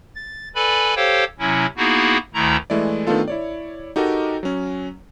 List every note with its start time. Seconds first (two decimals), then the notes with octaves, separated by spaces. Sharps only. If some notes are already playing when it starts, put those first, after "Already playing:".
0.15 A6
0.55 A4 B4 D5 G#5 B5
0.96 G4 A4 C5 C#5 F5 G5
1.39 C3 F#3 C#4 E4
1.77 A#3 B3 D#4 E4 F#4 G#4
2.34 D2 D#3 A3 E4 A#5
2.70 E3 G#3 A3 E4 D5
3.07 D#3 A3 B3 D4 F4 A4
3.28 E4 C#5 D5
3.96 D#4 F#4 G4 A4 A#4 D#5
4.43 F#3 C#4